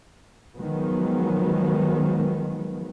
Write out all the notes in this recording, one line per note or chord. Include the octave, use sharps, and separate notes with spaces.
D#3 F3 F#3 G#3 B3